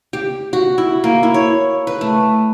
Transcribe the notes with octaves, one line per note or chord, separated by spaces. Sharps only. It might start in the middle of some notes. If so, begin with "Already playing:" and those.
G4
F#4
E4
A#3
E4
C#5
B4
A3